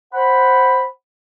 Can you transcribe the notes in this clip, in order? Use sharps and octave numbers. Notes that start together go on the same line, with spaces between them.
C5 F#5 B5